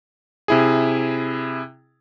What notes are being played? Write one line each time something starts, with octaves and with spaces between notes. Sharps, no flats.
C3 E4 G#4